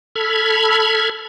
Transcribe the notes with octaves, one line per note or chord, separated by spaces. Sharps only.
A4 B5 F6 G#6